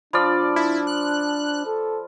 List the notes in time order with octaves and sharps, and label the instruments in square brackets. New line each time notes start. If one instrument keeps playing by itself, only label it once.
[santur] F3 D5 [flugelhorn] D4 [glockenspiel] B5 F6
[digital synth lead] E4
F#6
[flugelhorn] A4